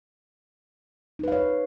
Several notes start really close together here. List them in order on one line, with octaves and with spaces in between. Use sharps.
D#4 B4 F5 C#5